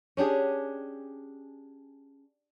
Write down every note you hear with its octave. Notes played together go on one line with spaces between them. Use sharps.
C#4 D4 G4 G#4